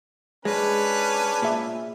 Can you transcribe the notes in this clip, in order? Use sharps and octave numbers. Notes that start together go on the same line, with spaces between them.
G#3 C#4 D4 G#4 B4
A#2 E5